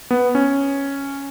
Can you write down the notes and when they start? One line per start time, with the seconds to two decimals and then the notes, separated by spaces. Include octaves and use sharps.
0.11 B3
0.35 C#4